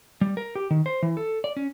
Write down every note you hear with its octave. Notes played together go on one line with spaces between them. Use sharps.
G3
A#4
G4
D#3
C5
E3
A4
D5
C#4